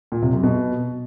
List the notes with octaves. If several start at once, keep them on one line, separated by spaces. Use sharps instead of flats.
A#2
C3
F#2
B2